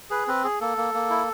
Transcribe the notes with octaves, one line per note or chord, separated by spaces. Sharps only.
G#4 B4
C4 B4
G#4
A#3 A4
A#3
A#3
E4